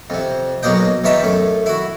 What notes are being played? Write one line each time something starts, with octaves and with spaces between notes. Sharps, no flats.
F2 C3
B1 B2 F#3 A#3 D#5 G5
E2 D#3 D#4 C#5 E5 A5
F#2 A3
E4 F#4